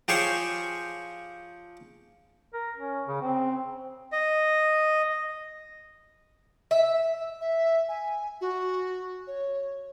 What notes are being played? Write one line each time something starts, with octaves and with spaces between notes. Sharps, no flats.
F3 G4 G#4 C5 C#5 G#5
A#4
C#4
C#3
C4
D#5
E5
E5
G#5
F#4
C#5